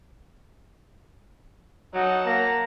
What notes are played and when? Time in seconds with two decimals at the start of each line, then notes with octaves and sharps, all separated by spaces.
1.94 F#3 D#4 F#5 A5
2.26 A#3 A#5